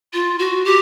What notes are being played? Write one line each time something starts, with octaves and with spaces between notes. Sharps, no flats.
F4
F#4
G4